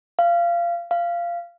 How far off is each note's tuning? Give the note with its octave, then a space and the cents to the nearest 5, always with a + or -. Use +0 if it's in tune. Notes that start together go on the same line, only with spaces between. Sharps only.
F5 -20
F5 -15